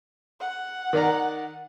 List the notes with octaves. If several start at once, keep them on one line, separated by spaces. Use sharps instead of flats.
F#5
D#3 D5 A#5